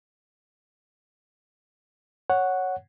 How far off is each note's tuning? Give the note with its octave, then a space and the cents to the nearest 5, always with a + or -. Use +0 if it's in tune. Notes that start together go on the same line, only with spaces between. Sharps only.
C#5 +0 F#5 +0